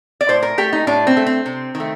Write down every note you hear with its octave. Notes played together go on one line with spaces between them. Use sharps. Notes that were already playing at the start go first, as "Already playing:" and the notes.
D5
A2 C5
A#4
A3 G4
D#4
A2 D4
C4
A3
C4
C3
D#3
A3